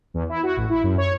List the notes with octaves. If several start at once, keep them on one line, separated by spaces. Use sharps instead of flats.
E2
E4
F#4
A1
E4
F#2
C#5